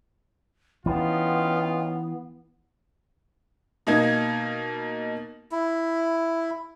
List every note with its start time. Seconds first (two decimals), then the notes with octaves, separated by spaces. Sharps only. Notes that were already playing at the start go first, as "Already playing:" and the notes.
0.86 E3 B3 C#4 D#4 F4 G5
3.87 B2 A#3 D#4 G#6
5.52 E4